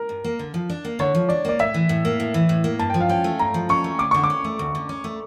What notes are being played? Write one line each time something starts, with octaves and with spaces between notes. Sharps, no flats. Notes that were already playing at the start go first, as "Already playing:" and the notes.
Already playing: A#4
G2
A#3
D3
F3
D4
A#3
D3 C#5
F3
D4 D5
A#3 D5
A2 E5
E3
A2
A#3
A2
E3
A2
A#3
G2 A5
F3 G5
F5
C#4 G5
A3
G2 A#5
F3
C#4 C#6
A3
D2 D6
D3 C#6
D6
C#4
A3
D2
D3
C#4
A3